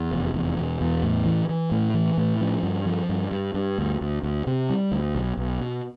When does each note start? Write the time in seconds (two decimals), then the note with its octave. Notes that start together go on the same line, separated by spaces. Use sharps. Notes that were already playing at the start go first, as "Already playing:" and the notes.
Already playing: E2
0.11 F1
0.34 E2
0.57 B2
0.81 E2
1.03 A2
1.26 E3
1.49 E3
1.71 A2
1.94 E3
2.17 A2
2.41 F3
2.63 G2
2.86 F3
3.09 G2
3.31 G2
3.54 G2
3.78 D2
4.01 D2
4.23 D2
4.47 C3
4.70 G3
4.92 D2
5.15 B1
5.37 B1
5.61 B2